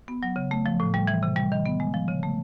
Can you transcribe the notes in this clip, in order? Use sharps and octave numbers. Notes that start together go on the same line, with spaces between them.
B3
F#3
C#3
A3
F3
A2
G3
E3
C3
G3
D#3
B3
G#3
F3
C#3
A3